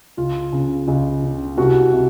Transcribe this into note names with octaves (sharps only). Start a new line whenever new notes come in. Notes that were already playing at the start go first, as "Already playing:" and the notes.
C#2 F4
C#3
C#2
C#3
C2 F#4
C3